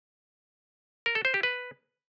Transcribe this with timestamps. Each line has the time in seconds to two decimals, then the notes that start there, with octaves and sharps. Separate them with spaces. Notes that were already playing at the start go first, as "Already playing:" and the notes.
1.06 A#4
1.15 A4
1.25 C5
1.34 G4
1.43 B4